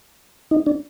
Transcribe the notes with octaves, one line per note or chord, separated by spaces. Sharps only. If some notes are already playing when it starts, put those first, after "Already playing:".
D#4
D4